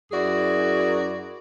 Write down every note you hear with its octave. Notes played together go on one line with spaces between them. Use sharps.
F#2 E4 F#4 G#4 D5